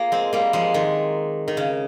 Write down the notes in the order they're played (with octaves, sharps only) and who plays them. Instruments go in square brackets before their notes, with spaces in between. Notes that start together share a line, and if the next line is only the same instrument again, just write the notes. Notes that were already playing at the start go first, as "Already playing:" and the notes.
Already playing: [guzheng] A#3 F4 G#4
G#3 C4
G3 A#3
F3 G#3
D#3
D#3
C#3